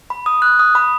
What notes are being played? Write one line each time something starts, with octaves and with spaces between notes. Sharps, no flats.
B5
D#6
F#6
D#6
B5